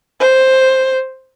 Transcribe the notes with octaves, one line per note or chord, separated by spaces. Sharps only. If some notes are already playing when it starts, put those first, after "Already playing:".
C5